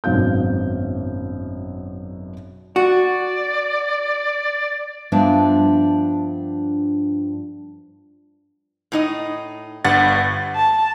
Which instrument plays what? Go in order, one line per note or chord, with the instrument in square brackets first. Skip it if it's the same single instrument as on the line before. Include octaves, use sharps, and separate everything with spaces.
[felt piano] G#1 F#2 B2 F5 G6
[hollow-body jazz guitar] F#4 [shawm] D5
[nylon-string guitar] G2 F3 B3 D4 E5
[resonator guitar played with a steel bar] A2 D#4 D#5
[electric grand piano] G1 G2 A6 [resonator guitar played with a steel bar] F#5
[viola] A5